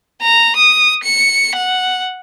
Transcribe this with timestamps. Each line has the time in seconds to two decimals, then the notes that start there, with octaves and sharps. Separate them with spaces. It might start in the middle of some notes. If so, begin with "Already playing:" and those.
0.22 A#5
0.57 D#6
1.04 C#7
1.56 F#5